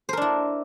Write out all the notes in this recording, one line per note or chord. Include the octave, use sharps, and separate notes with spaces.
D4 E4 A#4 C5